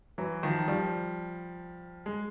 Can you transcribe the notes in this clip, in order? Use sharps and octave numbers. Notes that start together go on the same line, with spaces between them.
E3 F#3
D#3 F3
F3 G3
G#3